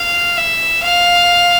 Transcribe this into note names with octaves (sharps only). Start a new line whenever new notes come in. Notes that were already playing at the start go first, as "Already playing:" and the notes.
Already playing: F5
E5
F5